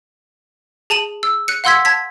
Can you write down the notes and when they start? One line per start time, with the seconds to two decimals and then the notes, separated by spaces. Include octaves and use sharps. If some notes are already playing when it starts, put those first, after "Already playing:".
0.90 G#4 A5 D#7 F#7
1.23 E6
1.48 F#6 C#7
1.64 F5 F#5 C6 E6 G#6 B6
1.85 A5 G#6 B6